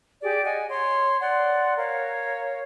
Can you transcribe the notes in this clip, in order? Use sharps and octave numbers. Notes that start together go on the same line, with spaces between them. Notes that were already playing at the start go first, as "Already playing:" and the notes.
G4 G#4 D5
D#5 F#5 G#5
C#5 C6
D5 F#5 C6
A#4 C#5 F5